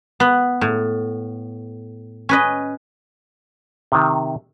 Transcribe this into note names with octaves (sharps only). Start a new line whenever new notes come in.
B3
A2
C#4 B4 D#5
C3 D#3